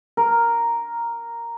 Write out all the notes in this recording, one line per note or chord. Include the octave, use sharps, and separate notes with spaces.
A#4